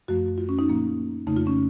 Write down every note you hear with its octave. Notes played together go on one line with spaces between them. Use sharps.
F#2 F3 A3 F#4
F4
C#4
D#4
A#2 F3 A#3
F2 C#3 A3 D#4
F4
C#4